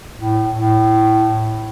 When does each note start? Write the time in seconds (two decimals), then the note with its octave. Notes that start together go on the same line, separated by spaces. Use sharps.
0.18 A2
0.54 A2